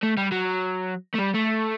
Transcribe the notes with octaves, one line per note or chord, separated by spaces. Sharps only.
A3
G3
F#3
A3
G3
A3